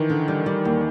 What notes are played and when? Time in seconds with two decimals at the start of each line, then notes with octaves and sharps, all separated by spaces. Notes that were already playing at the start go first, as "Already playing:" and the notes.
Already playing: D#3 E3
0.10 D3
0.28 G3
0.46 G3
0.65 D#2